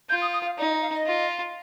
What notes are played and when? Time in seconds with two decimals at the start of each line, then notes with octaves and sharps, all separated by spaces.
0.09 F4 G6
0.22 D#6
0.34 D#6
0.46 F5
0.58 D#4 D5
0.70 D#5
0.82 F5
0.94 D#5
1.06 F4